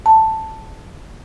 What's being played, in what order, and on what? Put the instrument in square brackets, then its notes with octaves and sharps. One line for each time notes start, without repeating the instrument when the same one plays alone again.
[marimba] A5